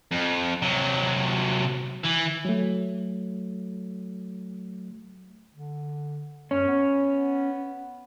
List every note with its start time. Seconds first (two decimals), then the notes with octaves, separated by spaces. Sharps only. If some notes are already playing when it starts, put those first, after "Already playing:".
0.12 F2
0.62 C3 F#3
2.05 E3
2.45 F#3 A3
5.54 D3
6.51 F#2 C#4
6.68 B3